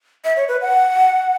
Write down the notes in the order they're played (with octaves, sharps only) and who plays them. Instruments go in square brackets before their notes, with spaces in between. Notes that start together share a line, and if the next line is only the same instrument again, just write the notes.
[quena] E5
C#5
B4
F#5